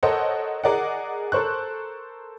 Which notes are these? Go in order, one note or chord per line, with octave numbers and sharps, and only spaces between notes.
A4 A#4 C5 C#5 D#5 F#5
G#4 A#4 D5 D#5 F#5
A4 A#4 C5 C#6 F#6